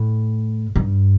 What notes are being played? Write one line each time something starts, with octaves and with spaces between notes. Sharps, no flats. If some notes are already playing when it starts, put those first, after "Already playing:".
Already playing: A2
G2